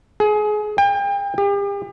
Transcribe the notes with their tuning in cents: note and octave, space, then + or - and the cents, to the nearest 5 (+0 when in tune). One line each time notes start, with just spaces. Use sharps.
G#4 +25
G5 +35
G4 +40